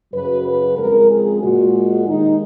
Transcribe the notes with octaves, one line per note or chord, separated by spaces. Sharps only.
F#2 C#3 F#3 B4
B4
F2 C#3 G#3 A#4
G#4
A#2 G#3 F#4
D#2 D#3 G#3 D#4